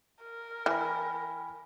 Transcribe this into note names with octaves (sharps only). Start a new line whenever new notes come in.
A#4
E3 G5 G#5 B5